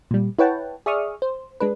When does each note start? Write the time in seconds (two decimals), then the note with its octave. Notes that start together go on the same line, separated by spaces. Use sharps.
0.11 A#2 G3
0.39 E4 B4 C#5 F#5 G5 A5
0.86 G#4 D5 E5 C#6 D#6 F6
1.22 C5
1.60 G#3 D4 B4